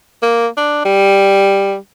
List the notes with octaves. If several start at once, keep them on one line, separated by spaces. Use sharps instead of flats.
A#3
D4
G3